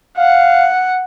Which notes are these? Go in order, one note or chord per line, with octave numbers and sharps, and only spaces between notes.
F5 F#5